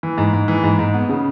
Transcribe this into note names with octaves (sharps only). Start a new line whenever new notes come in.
E3
G#2
G#2
E3
G#2
G#2
B3
C#3